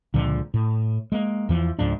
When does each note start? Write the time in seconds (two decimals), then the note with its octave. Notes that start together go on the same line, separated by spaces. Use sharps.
0.14 C#2 A#2 D3 F3
0.54 A2
1.12 G#3 A#3
1.49 E2 E3 F3
1.79 C#2 G#2 F3 D4